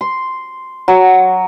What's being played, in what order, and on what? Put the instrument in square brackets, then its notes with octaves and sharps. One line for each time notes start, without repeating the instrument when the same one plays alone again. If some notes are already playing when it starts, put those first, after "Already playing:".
[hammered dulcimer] C6
F#3